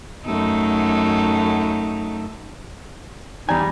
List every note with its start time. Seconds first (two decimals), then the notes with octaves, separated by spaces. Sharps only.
0.25 F#2 A3 D#4
3.49 E2 G3 D#4 G#5